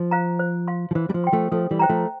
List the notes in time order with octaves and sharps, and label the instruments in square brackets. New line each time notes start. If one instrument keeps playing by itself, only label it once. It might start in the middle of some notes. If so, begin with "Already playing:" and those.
Already playing: [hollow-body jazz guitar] F3
[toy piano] C5 F5 A#5
C5
F5 C6
[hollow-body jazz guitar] F3
[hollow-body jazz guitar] E3 [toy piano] C5
[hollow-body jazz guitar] G3
F3
[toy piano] G5 C6
[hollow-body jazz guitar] F3 A3
[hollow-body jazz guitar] F3 A3 [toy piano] A4
[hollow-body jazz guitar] E3 G3
[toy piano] C5 E5 G5 A#5
[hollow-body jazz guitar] F3 A3